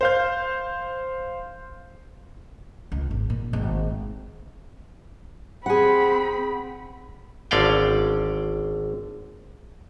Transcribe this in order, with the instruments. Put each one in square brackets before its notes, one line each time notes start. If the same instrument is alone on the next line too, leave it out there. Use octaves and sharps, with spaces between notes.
[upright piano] C5 F5 G6
[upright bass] C#2
G#1
A#2
G#1
[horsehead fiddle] C4 B5 [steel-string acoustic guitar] G#4 F#5
[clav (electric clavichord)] G#1 D3 C#4 D5 F5 G5